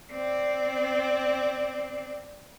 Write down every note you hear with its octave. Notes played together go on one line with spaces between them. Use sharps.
C4 D5